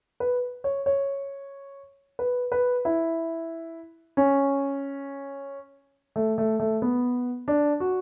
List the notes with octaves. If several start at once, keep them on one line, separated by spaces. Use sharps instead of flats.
B4
C#5
C#5
B4
B4
E4
C#4
A3
A3
A3
B3
D4
F#4